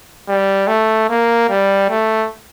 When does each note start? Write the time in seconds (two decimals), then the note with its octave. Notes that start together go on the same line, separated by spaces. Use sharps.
0.28 G3
0.68 A3
1.09 A#3
1.49 G3
1.90 A3